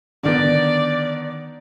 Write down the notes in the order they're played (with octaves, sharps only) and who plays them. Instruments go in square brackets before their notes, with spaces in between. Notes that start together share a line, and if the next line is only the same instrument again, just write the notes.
[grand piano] D3 D#3 B3 [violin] D5